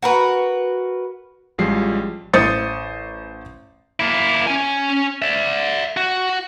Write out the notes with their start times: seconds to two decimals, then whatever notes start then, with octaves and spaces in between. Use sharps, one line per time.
0.02 F#4 A#4 B4
1.58 A1 F3 G3 G#3 C7
2.33 A1 C5 D#6 A6 C#7
4.00 A#3 E4
4.47 C#4 G#5
5.22 D5 E5
5.97 F#4